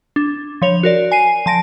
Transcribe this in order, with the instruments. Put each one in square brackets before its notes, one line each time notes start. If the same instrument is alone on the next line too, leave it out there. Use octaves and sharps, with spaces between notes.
[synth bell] D4
F3 C#5 F7
F#4 A#4 D5
G#5 C7 D#7
F3 A5 A#6 D7